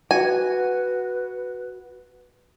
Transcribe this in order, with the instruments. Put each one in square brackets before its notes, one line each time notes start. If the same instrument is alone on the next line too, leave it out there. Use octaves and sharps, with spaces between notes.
[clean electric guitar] F#4 [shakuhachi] B4 [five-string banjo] G#5